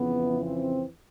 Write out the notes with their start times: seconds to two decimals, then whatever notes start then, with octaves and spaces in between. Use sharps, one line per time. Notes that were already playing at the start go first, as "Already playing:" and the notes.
Already playing: F2 C#3 E3 B3
0.43 C4